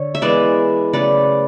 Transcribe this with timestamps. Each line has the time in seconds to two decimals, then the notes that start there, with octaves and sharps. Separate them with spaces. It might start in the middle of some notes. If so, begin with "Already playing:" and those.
Already playing: D3 C#5
0.15 E5
0.22 E3 G#3 B3 B4 D5
0.93 C#3 F#3 A3 B4 D5